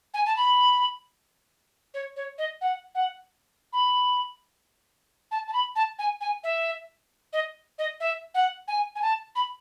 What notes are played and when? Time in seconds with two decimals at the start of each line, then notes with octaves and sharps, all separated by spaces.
0.14 G#5
0.26 A5
0.36 B5
1.94 C#5
2.16 C#5
2.38 D#5
2.61 F#5
2.95 F#5
3.73 B5
5.31 A5
5.48 A5
5.53 B5
5.76 A5
5.99 G#5
6.21 G#5
6.44 E5
7.33 D#5
7.78 D#5
8.00 E5
8.34 F#5
8.68 G#5
8.95 G#5
9.02 A5
9.35 B5